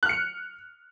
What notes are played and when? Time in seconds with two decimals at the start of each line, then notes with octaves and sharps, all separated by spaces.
0.03 F#6
0.06 F6
0.09 C#7